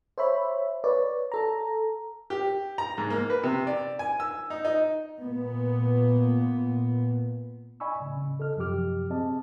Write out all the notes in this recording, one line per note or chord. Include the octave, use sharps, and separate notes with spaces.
C5 C#5 E5 B5
B4 C#5 D5
A4 A#5
G4
A#5
G#2
A#3
B4
C3
D5
G#5
E6
D#4
D#4
A#2 B3
D5 D#5 G#5 B5 C#6 E6
A2 C#3
C#3
A4 D#5 F6
F#2 C3 F3 G4 D6 F6
C4 G#4 D#5 A5